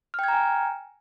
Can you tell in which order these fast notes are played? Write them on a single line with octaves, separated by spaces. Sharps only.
F6 G5 G#6 A#5 G#5